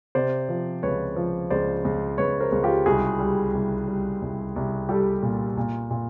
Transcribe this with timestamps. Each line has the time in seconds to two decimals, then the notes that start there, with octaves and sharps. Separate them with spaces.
0.15 C3 C5 D5
0.49 F3
0.83 C#2 B4 C#5
1.16 F3
1.50 C#2 C5 D5
1.85 C#2
2.18 C#2 B4 C#5
2.40 A#4 C5
2.52 C#2
2.63 F4 G4
2.86 C2 F#4 G#4
3.19 G3
3.53 C2
3.88 G3
4.21 C2
4.56 C2
4.89 G3 G4 A4
5.22 A#2
5.57 A#2
5.91 A#2